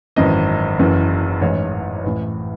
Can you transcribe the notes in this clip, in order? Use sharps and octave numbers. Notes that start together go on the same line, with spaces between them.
G#1 F#2 E3 D#5
F#1 F#2 E3
A1 G#2 E3 C#5
A1 A2 E3